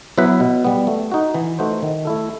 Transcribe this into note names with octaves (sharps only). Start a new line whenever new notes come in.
F#3 B3 E4 B4
B2
G3 B3
A3
D#4 F#4
E3
A3 D#4 F#4 C5
D#3
A3 E4 A4